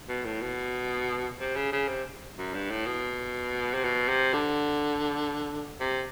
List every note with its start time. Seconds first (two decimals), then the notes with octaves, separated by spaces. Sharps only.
0.08 B2
0.25 A2
0.41 B2
1.40 C3
1.56 C#3
1.72 C#3
1.88 C3
2.37 F#2
2.54 G2
2.70 A2
2.86 B2
3.74 C3
3.84 B2
4.09 C3
4.34 D3
5.80 C3